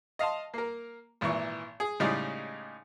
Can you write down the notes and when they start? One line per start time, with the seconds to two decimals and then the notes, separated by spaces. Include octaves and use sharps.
0.19 D#5 F5 A5 C6
0.54 A#3 A#4
1.21 G#1 A#2 E3 E4 C#6
1.80 G#4
2.00 A2 C#3 G3 G#3 D#4 D5